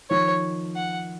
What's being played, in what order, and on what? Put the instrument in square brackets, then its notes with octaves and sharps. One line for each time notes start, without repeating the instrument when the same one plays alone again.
[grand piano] D#3 F3 [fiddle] C#5
[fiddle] F#5